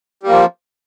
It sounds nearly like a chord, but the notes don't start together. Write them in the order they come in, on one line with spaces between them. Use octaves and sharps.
G3 A#3 F3